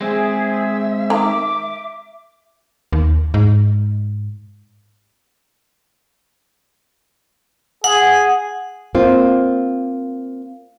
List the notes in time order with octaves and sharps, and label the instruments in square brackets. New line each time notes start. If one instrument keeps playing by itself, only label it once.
[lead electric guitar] G#3 C4 [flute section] G#4 [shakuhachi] E5
[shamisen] D#3 A#5 [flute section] D6
[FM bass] D#2
G#2
[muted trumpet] G#4 [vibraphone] F#5
[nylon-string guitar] A#3 C4 F4